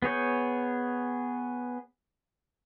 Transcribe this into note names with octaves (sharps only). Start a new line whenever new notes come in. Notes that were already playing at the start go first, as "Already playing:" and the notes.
B3 G#4 C#5 G6